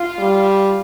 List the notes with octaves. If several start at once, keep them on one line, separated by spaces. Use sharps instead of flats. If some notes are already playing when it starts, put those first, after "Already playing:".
Already playing: F4
G3